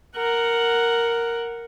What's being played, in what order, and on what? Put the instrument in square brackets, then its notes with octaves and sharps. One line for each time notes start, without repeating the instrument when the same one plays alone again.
[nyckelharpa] A#4 F#5